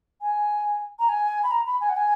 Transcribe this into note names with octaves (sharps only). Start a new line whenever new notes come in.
G#5
A#5
G#5
B5
A#5
B5
G#5
F#5
G#5